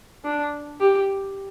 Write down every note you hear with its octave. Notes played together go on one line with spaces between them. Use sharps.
D4
G4